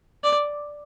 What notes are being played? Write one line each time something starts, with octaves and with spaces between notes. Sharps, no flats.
D5